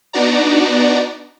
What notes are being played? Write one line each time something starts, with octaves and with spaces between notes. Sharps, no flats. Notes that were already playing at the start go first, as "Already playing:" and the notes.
B3 D4 D#4 F#4 D5 A#5